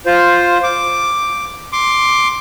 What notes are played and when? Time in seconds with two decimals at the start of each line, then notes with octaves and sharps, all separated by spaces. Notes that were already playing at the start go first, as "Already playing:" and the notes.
0.06 F4 C5
0.63 D6
1.72 C6 D6